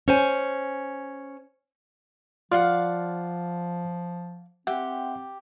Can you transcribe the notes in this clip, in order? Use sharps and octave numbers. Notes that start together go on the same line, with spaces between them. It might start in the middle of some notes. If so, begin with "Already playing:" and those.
C#4 C5 G#5
F3 F4 D5 F5 F#5 C6 F6
C4 G4 E5 F#5